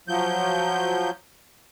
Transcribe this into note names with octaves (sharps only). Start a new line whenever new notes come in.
F3 F#3 G6